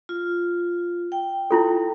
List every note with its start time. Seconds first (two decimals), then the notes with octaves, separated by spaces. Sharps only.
0.09 F4
1.12 G5
1.51 E4 F4 A4